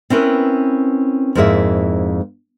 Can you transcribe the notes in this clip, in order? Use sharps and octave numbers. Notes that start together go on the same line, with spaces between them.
C4 C#4 E4 A#4 B4
F2 G#2 A#3 E4 G#4 E5